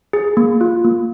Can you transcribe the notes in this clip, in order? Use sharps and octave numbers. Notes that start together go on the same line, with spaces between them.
G#4
A#3
F4
A#3